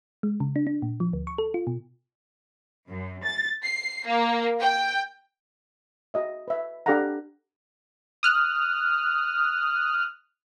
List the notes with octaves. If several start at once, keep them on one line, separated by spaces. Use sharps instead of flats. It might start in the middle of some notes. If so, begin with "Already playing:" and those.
G#3
C#3
D4
D4
A#2
F3
D2
C#6
A4
F4
B2
F#2
A6
C7
A#3
G5
F#4 D#5 E5
B4 E5
D4 G4 A4 F5 F#5 A#5
D#6 F6 F#6